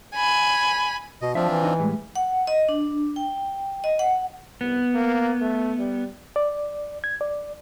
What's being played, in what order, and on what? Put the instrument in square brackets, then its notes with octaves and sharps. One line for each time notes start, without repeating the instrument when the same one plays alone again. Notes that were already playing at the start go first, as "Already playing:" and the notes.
[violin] G#5 B5
[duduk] B2 [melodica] D#5
[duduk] F3 [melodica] C4 D4 F4 [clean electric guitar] E5
[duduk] E3
[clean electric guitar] D#4 D#5
A2 G3 G#3
[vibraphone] F#5
D#5
D4
G5
D#5
F#5
[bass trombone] C2 [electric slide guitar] B3
[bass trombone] A#3
A3
G3
[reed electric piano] D5
G#6
D5